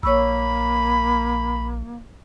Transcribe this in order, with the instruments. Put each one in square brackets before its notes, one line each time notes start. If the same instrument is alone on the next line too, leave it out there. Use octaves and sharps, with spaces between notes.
[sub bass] A#1 [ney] A#3 [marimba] C#5 C#6 E6 [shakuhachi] B5